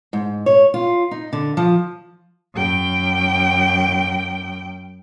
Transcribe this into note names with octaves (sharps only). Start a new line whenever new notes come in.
G#2
C#5
F4
D#4
D3
F3
F#2 G5